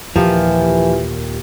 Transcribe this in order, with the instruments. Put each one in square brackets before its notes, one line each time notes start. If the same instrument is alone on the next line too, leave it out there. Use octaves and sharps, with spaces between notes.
[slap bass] D#2 A#2 [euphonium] E3 [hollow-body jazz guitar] F3 [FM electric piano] F4 G4 A#4